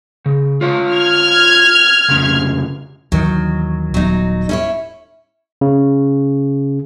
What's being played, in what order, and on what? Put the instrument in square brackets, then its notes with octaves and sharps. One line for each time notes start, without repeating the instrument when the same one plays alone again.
[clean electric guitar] C#3
F4 C#5 F5
[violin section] F6 G#6
[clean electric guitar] C2 F2 C#3
[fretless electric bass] D#2 D#3 E3 [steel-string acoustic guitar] F#3
[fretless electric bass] D#1 B3 [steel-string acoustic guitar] F#3 D#4
[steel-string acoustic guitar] C#4 E4 C#5
[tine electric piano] C#3